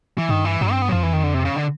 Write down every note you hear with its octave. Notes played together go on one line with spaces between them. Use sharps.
E3
G2 D#3
E3
G2 F#3
C4
B3
F#3
F2 F3
E3
D#3
D3
C3
C#3
D3